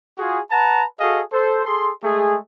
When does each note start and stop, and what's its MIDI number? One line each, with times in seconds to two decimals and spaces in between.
0.18 0.39 65
0.18 0.39 66
0.18 0.39 68
0.51 0.85 71
0.51 0.85 78
0.51 0.85 81
0.51 0.85 82
1.00 1.21 66
1.00 1.21 68
1.00 1.21 69
1.00 1.21 75
1.00 1.21 77
1.32 1.63 69
1.32 1.63 72
1.65 1.91 68
1.65 1.91 69
1.65 1.91 84
2.04 2.37 56
2.04 2.37 57
2.04 2.37 68